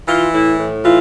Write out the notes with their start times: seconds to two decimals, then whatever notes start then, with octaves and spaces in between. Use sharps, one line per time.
0.08 E3 F4
0.33 A2 E4
0.59 A2
0.85 E3 F4